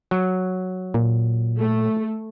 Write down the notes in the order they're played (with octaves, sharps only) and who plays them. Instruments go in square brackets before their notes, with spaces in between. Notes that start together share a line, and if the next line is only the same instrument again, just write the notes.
[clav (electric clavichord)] F#3
[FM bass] A#2
[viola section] A3